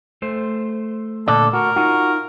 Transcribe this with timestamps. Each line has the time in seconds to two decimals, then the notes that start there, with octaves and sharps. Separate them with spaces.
0.22 A3 C5
1.28 A#2 D3 A4 D5
1.53 F#4 A#4
1.76 D#4 F4 F#4